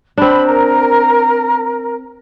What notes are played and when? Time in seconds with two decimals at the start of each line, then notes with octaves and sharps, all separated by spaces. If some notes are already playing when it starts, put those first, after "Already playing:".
0.18 C4 D4 B5
0.46 A#4